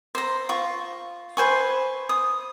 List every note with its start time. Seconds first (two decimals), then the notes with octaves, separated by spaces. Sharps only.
0.15 C5 A#5
0.49 F4 C#6
1.37 B4 C5 G#5 C#6
2.09 D#6